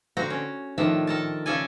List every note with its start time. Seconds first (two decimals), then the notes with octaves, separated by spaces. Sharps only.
0.17 D3 C4 F#4 A#5
0.30 C#4
0.78 A2 D#3 F3 D4 E5
1.07 A4 A#4 A5
1.46 C#3 C#4 A4 D5 G#5